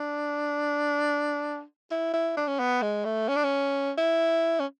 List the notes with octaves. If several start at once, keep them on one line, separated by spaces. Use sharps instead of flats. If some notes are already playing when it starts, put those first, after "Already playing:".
Already playing: D4
E4
E4
D4
C#4
B3
G#3
A3
C#4
D4
C#4
E4
C#4